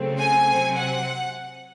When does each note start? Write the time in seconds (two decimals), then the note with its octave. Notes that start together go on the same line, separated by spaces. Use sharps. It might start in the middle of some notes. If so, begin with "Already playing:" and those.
Already playing: C#3 F#3 A3 C4
0.19 G#5
0.47 C3 F#3 C4
0.75 F#5